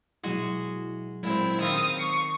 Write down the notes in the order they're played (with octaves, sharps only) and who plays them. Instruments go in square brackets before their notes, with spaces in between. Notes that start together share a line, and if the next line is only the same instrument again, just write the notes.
[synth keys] B2 F#3 E4 [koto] G#3 F#4 G#4
[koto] A#2 [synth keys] F#3 G#3 [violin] C4 E4
[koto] D#3 C4 [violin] F5 D#6
[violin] C#6 [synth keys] C7